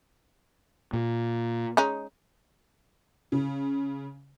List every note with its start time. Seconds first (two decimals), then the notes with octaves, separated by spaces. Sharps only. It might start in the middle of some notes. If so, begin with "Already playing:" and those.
0.93 A#2
1.77 G#3 C#4 D#4
3.32 C#3